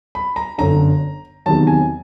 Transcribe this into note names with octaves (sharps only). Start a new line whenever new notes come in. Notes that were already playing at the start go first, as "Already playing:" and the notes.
B5
A#5
G1 F#2 D3 A#5
E2 C3 D#3 F#3 A5
G#5